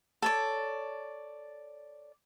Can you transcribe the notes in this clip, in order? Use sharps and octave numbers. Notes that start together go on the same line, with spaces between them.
A4 C#5 D5